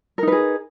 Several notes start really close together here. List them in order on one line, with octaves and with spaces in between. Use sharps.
A#4 D#4 B4 G#4